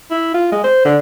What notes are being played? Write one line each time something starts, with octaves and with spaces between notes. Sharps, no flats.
E4
F4
G#3
C5
D3